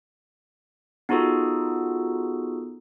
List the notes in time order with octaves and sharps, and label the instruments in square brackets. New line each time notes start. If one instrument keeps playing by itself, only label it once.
[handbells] B3 D#4 F4 F#4 G#4 A4